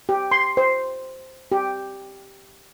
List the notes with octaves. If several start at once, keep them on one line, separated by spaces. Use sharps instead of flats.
G4
C6
C5
G4